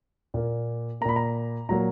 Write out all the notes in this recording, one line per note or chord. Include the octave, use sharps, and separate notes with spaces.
A#2 A#3
A#2 A#3 A#5 B5
A#5
A#2 F#3 A#3 A#5